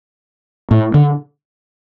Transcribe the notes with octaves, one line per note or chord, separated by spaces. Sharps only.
A2
D3